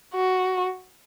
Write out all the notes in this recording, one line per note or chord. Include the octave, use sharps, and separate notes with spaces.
F#4